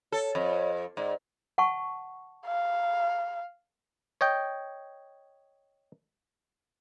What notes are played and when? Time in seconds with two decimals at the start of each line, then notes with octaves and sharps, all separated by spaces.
0.12 A4 C#5
0.35 F2
0.97 G#2 D5
1.58 F#5 A5 C#6
2.47 F5
4.21 C#5 D#5 G5